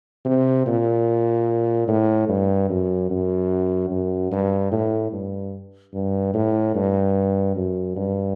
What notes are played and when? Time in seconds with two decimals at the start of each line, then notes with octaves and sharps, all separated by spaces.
0.25 C3
0.66 A#2
1.88 A2
2.29 G2
2.69 F#2
3.10 F#2
3.90 F#2
4.32 G2
4.72 A2
5.12 G2
5.94 G2
6.34 A2
6.75 G2
7.56 F#2
7.96 G2